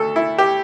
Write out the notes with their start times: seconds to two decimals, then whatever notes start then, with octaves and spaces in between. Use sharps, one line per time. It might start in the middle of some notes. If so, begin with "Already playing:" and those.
Already playing: D2 A4
0.16 E4
0.38 G4